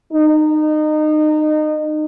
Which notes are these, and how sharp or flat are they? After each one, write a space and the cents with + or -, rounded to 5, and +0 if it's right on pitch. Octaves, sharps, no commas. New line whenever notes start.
D#4 -25